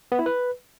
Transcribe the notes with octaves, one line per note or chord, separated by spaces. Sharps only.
B3
E4
B4